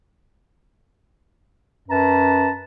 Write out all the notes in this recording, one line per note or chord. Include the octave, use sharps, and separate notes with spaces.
F#2 B4 A5 A#5